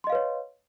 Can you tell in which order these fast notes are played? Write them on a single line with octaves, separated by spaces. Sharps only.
C6 D#5 F5 B4 C#5